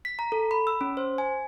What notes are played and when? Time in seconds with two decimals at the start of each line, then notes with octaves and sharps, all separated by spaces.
0.05 B6
0.19 A#5
0.32 A4
0.51 B5
0.67 E6
0.81 C#4
0.97 C5
1.18 G#5